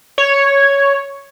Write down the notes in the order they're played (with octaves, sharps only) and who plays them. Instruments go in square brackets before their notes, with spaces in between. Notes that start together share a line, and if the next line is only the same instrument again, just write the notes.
[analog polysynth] C#5